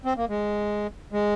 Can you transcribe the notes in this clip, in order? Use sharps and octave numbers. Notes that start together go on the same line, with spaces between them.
C4
A#3
G#3
G#3